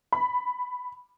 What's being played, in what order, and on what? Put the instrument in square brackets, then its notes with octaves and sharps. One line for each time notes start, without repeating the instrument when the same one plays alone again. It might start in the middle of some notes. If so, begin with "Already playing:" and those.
[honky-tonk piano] B5